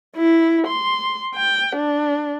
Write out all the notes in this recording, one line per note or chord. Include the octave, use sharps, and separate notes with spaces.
E4
C6
G5
D4